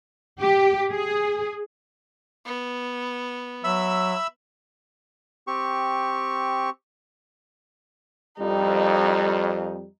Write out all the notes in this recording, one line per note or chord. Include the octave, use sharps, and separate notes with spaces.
G4
G#4
B3
F#3 E5 B5 E6
C4 G4 C#6
F2 G3 D#4